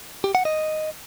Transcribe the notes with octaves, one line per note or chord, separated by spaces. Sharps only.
G4
F#5
D#5